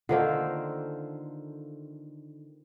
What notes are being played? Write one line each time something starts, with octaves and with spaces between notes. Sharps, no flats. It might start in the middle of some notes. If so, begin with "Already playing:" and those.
D3 D#3 A#3 F4 A4 C5